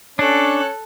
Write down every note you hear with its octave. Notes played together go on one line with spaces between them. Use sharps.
C#4 D4 A4 C#5 F#6